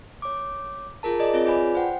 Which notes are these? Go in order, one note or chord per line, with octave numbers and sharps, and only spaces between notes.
C#5 D6
F4 G#4 A#4 A5
G#4 D5 D#5
C4 F4 G#4 C#5
F4 B4 D5 G#5 B5
C5 F#5 G5